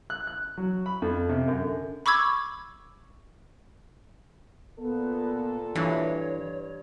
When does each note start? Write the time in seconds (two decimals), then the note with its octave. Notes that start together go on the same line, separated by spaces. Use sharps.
0.10 F#6
0.27 F#6
0.58 F#3
0.86 B5
1.02 F2
1.29 C3
1.48 F#2
1.62 D3
2.06 B5 C#6 D6 E6 G#6
4.79 A#2 B3 A4
5.75 G2 E3 C#5